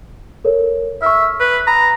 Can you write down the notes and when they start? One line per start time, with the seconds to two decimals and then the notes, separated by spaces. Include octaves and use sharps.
0.45 A4 A#4 C#5
1.02 E5 C#6 F6
1.40 B4
1.67 A#5 B5 D#6